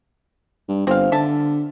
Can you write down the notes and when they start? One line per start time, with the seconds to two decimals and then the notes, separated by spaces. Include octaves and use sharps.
0.69 G2
0.87 G1 C4 F5
1.12 D3 E5 A5